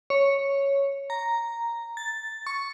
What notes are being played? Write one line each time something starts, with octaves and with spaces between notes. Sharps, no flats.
C#5
A#5
A6
C#6